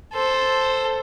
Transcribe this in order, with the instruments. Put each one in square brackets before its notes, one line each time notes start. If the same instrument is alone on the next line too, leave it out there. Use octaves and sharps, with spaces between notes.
[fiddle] A4 C5